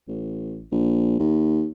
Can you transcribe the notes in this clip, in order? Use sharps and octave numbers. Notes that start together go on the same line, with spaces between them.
A1
A#1
D#2